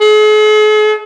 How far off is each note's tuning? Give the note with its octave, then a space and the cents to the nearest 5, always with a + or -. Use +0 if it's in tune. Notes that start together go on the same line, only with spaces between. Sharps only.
G#4 +45